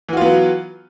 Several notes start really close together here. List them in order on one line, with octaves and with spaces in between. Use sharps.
E3 F#4 F4 B3 F#3